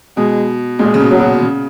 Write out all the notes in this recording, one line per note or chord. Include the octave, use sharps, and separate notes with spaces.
B2 G#3
A#2 G#3
C#3
B2
F#3
B2
C#3